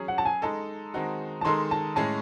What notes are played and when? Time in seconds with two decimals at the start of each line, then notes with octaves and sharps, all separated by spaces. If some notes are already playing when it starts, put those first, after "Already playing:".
Already playing: F#3 C#4 G#4
0.08 F#5
0.18 A5
0.25 G#5
0.42 G#3 D#4 A4 A5
0.94 D#3 G#3 C4 D#4 F#4
1.41 A5
1.45 D#3 G#3 D#4 A4 C6
1.71 A5
1.96 A2 G#3 C#4 G#4 A5